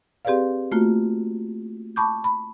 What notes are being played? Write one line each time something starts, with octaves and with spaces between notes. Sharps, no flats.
C4 G4 G#4 B4 D5 F5
A3 A#3 F4 F#4
A5 B5 C#6 D6 G6
B5